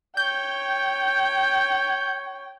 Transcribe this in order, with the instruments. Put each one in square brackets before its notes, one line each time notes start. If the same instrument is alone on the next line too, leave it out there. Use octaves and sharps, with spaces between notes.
[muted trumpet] C#5 [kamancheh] G5 [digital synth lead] G6